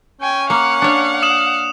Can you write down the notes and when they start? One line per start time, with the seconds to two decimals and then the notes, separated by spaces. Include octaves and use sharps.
0.21 C#4 G5 G#5
0.50 A#3 F5 F#5
0.82 D4 C#5
1.23 D#6 E7 F#7